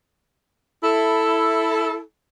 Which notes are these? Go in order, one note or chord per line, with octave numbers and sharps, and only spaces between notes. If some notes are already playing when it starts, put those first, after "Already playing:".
E4 A4